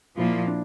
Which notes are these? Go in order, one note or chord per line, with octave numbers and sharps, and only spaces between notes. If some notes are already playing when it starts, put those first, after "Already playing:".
A#2 F3 A#3 E4
D4